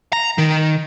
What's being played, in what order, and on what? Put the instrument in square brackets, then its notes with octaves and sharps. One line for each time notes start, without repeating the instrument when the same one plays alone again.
[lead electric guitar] A#5
D#3